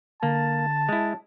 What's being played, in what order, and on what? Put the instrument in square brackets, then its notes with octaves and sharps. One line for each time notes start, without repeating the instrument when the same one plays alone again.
[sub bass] D3 [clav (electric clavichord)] A#3 [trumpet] A5
[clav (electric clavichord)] G#3 E4